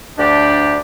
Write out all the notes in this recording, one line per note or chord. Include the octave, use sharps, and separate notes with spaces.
D2 D4 G4 D5